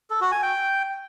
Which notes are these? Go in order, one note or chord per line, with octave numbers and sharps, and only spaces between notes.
A4
F#4
G#5
G5